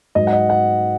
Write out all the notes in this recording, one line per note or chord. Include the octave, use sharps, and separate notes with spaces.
G#2 F#3 D#5
F#5
D#5
F#5